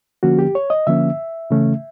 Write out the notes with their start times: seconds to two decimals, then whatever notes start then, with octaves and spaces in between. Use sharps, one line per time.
0.23 D3 F3 A#3 C#4 F#4
0.39 G4
0.55 C#5
0.70 D#5
0.87 D3 F3 A#3 C#4 E5
1.50 C#3 E3 A3 C#4